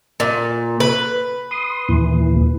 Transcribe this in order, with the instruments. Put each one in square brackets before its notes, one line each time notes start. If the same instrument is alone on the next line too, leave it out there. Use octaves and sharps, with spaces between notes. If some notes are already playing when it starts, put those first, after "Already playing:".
[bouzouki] A#2
B4
[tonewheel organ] C6 D#6
D#2 A#2 E3